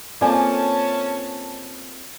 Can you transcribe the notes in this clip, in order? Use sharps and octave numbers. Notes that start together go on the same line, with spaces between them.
A#3 C4 C#4 F4 A4 D5 G#5 A5